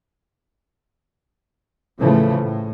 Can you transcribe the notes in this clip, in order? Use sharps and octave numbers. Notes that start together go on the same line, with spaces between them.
A2 C#3 E3 F3 A3
A2